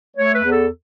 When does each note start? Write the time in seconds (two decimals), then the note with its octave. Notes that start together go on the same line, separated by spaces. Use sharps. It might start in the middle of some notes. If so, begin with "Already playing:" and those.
0.17 A3 C#5
0.33 B4
0.43 E2
0.51 A4